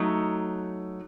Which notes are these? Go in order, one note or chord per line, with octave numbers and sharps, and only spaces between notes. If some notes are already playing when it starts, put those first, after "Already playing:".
Already playing: F#3 A3 D#4